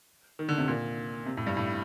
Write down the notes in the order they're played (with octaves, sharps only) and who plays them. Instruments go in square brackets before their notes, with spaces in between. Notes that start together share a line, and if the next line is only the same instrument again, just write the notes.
[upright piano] D#3
D3
C3
A#2
C3
A2
G2
A2